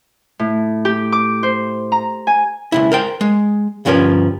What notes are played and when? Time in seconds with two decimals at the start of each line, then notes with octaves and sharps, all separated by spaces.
0.39 A2
0.85 G4
1.12 D6
1.43 C5
1.92 A#5
2.27 G#5
2.72 C#2 B2 E4
2.92 A#4 C5 G5
3.21 G#3
3.85 D2 G2 F3 C#4 A#4 B4